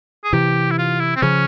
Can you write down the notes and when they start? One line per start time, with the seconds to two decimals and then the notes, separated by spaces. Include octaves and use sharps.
0.24 G#4
0.33 C3 E3 G4
0.71 E4
0.78 F4
1.00 E4
1.16 C4
1.22 C#3 F3 C#4